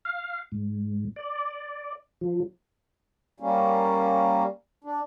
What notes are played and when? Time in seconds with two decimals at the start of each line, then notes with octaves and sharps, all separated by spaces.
0.05 F5
0.52 G#2
1.16 D5
2.21 F3
3.40 G3 A#3 C#4
4.84 D4